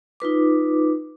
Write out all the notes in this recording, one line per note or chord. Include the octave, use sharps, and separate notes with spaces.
D#4 F4 B4 D6